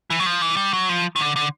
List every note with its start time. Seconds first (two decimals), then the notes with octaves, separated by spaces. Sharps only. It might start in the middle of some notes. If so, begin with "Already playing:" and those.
0.10 E3
0.20 F#3
0.26 F3
0.42 E3
0.57 G3
0.73 F#3
0.89 F3
1.16 D#3
1.20 D3
1.36 D3